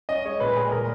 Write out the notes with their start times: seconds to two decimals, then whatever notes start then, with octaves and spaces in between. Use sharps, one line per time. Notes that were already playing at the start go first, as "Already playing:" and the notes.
0.09 C#4 D#5
0.25 G#3 C#5
0.40 A#2 B4
0.57 G#3 G#4
0.72 A#2 A#4